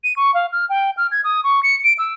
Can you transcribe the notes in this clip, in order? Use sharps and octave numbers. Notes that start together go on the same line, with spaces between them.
D#7
C#6
F5
F6
G5
F6
G#6
D#6
C#6
C#7
D7
E6